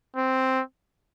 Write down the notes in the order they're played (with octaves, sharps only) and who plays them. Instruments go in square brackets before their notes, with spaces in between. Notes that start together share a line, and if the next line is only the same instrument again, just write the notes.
[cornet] C4